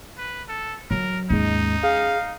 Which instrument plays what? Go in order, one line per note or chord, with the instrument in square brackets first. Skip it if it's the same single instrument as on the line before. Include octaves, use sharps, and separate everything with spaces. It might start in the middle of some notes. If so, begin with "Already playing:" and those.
[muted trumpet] B4
A4
[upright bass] F#3 [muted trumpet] A#4
[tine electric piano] D#2 G#2 G#3 [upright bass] C#4 [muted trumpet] D#4
[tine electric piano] G#4 [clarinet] F5